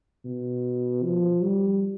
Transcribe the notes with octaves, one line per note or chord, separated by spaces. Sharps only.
B2
F3
G3